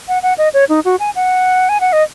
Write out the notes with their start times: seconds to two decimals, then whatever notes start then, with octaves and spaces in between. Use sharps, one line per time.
0.08 F#5
0.23 F#5
0.38 D#5
0.54 C#5
0.69 D#4
0.85 F#4
1.00 G#5
1.15 F#5
1.69 G#5
1.81 F#5
1.93 D#5